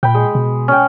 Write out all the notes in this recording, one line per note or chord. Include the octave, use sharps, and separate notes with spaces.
A#2 G5 B5
G#3
B2
C#4 G5